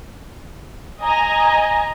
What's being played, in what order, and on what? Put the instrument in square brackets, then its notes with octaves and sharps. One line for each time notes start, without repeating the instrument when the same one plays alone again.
[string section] D#5 G#5 A#5